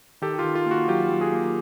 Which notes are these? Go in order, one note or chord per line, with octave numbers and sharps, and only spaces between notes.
D#3 G4 A4
F4 G4
D#3
F4
A#3
F#4
F#3 F4 G4
F#3
F#4 G#4
A#3